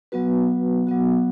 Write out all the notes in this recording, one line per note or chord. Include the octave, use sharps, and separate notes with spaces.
F#3 B3 F#4 B4
F#3 B3 F#4